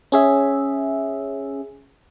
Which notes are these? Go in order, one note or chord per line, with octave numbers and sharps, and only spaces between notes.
C#4 G#4 E5